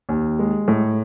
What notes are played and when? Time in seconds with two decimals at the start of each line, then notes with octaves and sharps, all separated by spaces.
0.09 D#2
0.39 G#3
0.68 A2